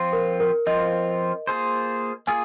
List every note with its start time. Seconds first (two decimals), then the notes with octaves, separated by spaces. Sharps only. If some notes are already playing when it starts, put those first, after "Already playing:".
Already playing: F3 C4 F4
0.13 A#4
0.40 A#4
0.67 F3 C4 F4 D#5
1.47 A#3 F4 G#4 C5
2.27 A#3 F4 G#4 G#5